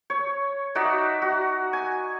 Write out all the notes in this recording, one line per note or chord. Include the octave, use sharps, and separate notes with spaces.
C#5
D#4 F#4 D5 E5
F#4
G#5